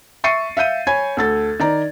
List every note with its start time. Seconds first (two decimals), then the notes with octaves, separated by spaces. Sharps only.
0.24 E5 C#6 A6 C7 C#7 D#7
0.57 E5 F5 G6 D#7
0.87 C#5 G#5 B5 G#6
1.17 D2 A4 A6
1.60 D#3 D5 A#5